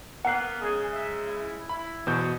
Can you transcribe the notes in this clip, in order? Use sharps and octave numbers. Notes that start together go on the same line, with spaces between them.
A#3 B3 F#5 A#5 F#6 C7
C#3 G#3 G#4
E5
E4
E4 B5
E2 B2 F#4 C5 G6